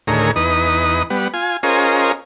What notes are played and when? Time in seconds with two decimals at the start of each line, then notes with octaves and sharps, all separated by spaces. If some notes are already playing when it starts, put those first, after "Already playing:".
0.07 D2 A2 D#3 G#4 A#4 C#5
0.36 E2 D#4 B4 D#6
1.10 G3 B3 F#5
1.34 F4 G#5
1.63 C#4 F4 G#4 A#4 C5 D#5